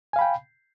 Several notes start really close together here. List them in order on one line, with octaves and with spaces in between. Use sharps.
G#5 F5 B5 G5